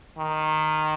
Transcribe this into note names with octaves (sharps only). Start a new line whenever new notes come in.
D#3